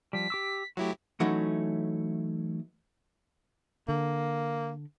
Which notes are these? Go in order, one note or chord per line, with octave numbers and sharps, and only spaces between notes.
F3 G3 B6
G4 D6 E6
F#3 A3 E4 F#4 G4
E3 F#3 A3 C#4 D#4 F#4
D3 A#3